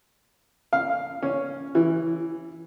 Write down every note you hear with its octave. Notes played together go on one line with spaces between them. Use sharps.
F5
C#4
E3